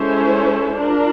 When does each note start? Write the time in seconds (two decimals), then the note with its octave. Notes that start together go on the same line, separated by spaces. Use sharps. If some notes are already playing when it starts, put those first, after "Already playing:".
Already playing: G#3 C#4 E4 A4 C5
0.79 D4 F4 A#4